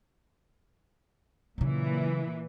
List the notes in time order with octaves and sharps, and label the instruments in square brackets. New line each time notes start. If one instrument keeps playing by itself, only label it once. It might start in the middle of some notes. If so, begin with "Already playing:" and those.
[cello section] A#2 E3 [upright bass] C#3 F#3